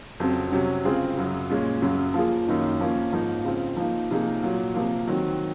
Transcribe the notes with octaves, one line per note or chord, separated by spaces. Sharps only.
F2 C#3 F#3 C4
C3 F#3 C#4
C#3 G#3 C4 F4 G#4
F#2 C#3 F#3
A#2 G#3 C#4 F4
F#2 C#3 F#3
F3 A#3 F4 G#4
F#2 D#3 A#3 D#4
F3 A#3 C#4
G#2 F3 A#3 D#4
C#3 F3 C4
F3 A#3 D#4
C3 F3 A#3 D#4 G#4
A#2 F#3 A#3 F4
C3 F3 A#3
D#3 F#3 C4